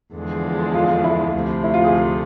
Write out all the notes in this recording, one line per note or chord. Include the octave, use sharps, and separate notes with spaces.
E2 D3 F3 G#3
F4
E4
D2 C3 F3 A3
E4
F4
G#4